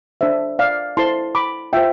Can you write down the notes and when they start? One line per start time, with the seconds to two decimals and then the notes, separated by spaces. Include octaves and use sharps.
0.21 D4 A4 C5 E5
0.59 D5 F5
0.97 E4 A4 C5 A5 C6
1.35 B5 D6
1.73 F4 C5 E5 G5